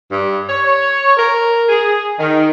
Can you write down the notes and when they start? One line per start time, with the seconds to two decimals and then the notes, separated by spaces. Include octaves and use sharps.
0.11 G2
0.48 C#5
1.17 A#4
1.69 G#4
2.19 D#3